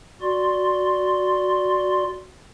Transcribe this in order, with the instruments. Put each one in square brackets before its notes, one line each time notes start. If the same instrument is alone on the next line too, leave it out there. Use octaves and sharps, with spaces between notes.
[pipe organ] F#4 D5 C6